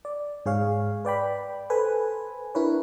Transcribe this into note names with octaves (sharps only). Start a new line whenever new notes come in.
D5
G#2 G#4 C#5 F5
B4 D5 G5 B5
A4 B4 C5 G#5
D4 E4 A#4 B4 C#5